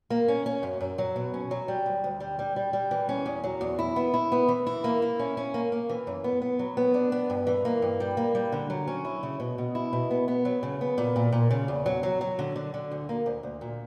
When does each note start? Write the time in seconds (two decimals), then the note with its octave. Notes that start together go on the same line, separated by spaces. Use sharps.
0.10 A#3
0.28 C#4
0.46 C#4
0.63 F#2
0.81 F#2
0.98 F#3
1.16 B2
1.34 C#4
1.51 F#3
1.68 G3
1.86 D2
2.04 D2
2.20 G3
2.39 G3
2.56 G3
2.73 G3
2.91 E3
3.09 C#4
3.26 E2
3.44 F#3
3.61 E2
3.79 E4
3.96 B3
4.14 E4
4.32 B3
4.48 E3
4.67 E4
4.84 A#3
5.02 E4
5.19 C#4
5.37 C#4
5.54 A#3
5.72 A#3
5.89 E3
6.07 F#2
6.24 B3
6.42 B3
6.59 F#3
6.77 B3
6.94 D4
7.12 B3
7.30 G2
7.47 E3
7.65 A#3
7.82 G2
8.00 G3
8.17 A#3
8.35 G3
8.52 D3
8.70 F#3
8.87 C#4
9.05 E4
9.23 C#3
9.40 B2
9.58 B2
9.75 E4
9.93 B2
10.10 B3
10.28 B3
10.45 F#3
10.63 C#3
10.81 B3
10.98 A#2
11.16 A#2
11.32 A#2
11.51 C#3
11.68 E2
11.86 F#3
12.03 F#3
12.21 F#3
12.39 D3
12.56 D3
12.74 D3
12.91 D2
13.09 A#3
13.26 D2
13.43 D2
13.61 A#2